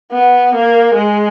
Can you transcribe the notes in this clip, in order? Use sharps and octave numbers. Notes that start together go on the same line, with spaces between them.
B3
A#3
G#3